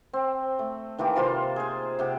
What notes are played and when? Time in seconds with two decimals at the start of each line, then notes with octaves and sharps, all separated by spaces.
0.13 C4
0.59 A3
0.99 D#3 E3 A#3 G4
1.16 C3 F4 C5 C6
1.56 G#4 C5
1.99 C3 G4 F#5